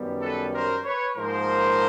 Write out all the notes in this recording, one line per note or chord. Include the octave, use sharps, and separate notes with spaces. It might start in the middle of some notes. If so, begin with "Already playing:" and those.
Already playing: F#2 D#3 G3 B3
A4 B4
A#4 C5
B4 C#5
G#2 F3 A#3 A#4 C5